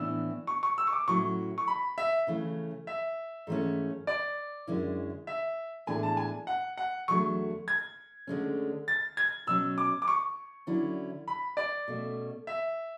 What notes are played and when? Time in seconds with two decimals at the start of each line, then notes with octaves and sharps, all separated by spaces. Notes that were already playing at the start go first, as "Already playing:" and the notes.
Already playing: A2 E3 B3 D4 E6
0.47 C#6
0.63 C#6
0.78 E6
0.87 C#6
0.93 D6
1.08 A2 F#3 C#4 E4 C#6
1.58 C#6
1.68 B5
1.98 E5
2.27 C#3 E3 A3 C#4
2.87 E5
3.47 G#2 E3 A3 C#4
4.07 D5
4.67 F#2 D3 G#3 C#4 E4
5.27 E5
5.87 A2 E3 G#3 B3 D4 G#5
6.03 A5
6.17 G#5
6.47 F#5
6.77 F#5
7.08 E2 D3 F#3 A3 C#6
7.68 G#6
8.27 D2 D3 G#3 C#4
8.88 A6
9.17 G#6
9.47 B2 F#3 C#4 E6
9.78 D6
10.02 D6
10.08 C#6
10.67 D3 F#3 C#4 E4
11.28 B5
11.57 D5
11.88 B2 A3 C#4
12.47 E5